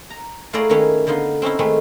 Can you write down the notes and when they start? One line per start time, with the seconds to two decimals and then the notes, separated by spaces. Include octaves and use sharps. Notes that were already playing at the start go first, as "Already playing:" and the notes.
0.10 A#5
0.53 A3 E4 F4 G#4 D5 A#5
0.69 D#3 A#3 C#4 E4 B4 C#5
1.07 D3 B3 D#4 F4
1.42 C4 C#4 D#4 E4
1.59 D#3 G#3 A3 C4 C#4 B4